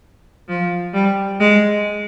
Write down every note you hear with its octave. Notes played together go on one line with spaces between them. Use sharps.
F3
G3
G#3